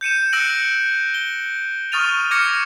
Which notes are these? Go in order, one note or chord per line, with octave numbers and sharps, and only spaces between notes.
G6 C#7 D#7 E7
E6 F#6 A#6 C#7 D7 F#7
G7
C#6 D#6 F6 A6 D#7 F7
D6 F6 G#6 A#6 C#7